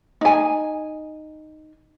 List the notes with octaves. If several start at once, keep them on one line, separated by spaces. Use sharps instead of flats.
D#4 G#5